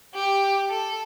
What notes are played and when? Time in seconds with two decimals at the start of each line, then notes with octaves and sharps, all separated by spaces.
0.15 G4
0.70 A4